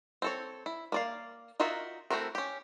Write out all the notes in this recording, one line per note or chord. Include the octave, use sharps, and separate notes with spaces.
C4 A4 C#5
E4
A#3 D5 F5
D#4 F4 F#4 A#4 E5
A3 C4 E4 F#4 A#4
C#4 G4